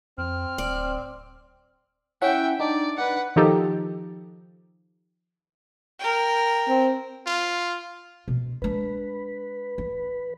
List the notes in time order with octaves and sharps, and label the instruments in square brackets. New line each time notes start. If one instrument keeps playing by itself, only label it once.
[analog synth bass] F2 [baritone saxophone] C4 [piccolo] F6
[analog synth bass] D1 [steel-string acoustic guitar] D5
[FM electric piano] C#4 E4 F#5 [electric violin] E5 G5
[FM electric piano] D4 D#4 [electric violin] D5
[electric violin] B4 F#5
[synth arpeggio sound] D#3 F3 D#4 G4 A4
[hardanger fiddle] A#4 G5
[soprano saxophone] C4
[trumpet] F4
[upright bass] B2
[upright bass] G#3 D4 [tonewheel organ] B4
[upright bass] E3